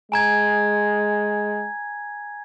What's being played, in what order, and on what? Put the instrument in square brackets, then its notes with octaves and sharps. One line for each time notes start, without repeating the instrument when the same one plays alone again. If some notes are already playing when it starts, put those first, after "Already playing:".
[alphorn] G#3 [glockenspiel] G#5 A#5 G#6